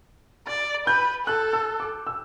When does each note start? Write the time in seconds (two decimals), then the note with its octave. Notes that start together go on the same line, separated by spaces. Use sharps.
0.47 D5 A6
0.87 B4 G6
1.26 A4 F#6
1.53 E6
1.80 D6
2.07 E6